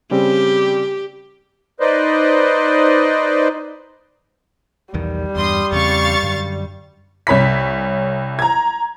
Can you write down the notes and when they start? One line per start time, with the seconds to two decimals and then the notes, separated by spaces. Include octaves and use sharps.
0.11 C#3 G3 C4 G4
1.80 D#4 B4 C5 D5 D#5
4.94 B1 E2 D#3 G3
5.36 E2 G2 C6 D#6
5.72 E2 C#3 C4 F5 C#6 A6
6.23 F#2 D3
7.27 C2 C#5 B5 B6
8.39 A#5 G#6